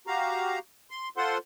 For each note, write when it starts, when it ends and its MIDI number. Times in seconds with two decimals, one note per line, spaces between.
0.07 0.59 66
0.07 0.59 67
0.07 0.59 77
0.07 0.59 82
0.90 1.09 84
1.17 1.38 65
1.17 1.38 69
1.17 1.38 72
1.17 1.38 78
1.17 1.38 84